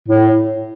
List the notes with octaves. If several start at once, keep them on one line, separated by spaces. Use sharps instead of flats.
A2